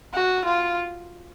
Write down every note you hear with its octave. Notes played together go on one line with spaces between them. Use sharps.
F#4
F4